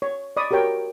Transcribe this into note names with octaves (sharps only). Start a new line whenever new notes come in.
C#5
D5 D#5 B5 C#6 D#6
F#4 G4 A#4 C#5 G5